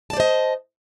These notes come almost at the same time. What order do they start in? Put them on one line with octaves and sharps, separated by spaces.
A5 D5 C5 D#5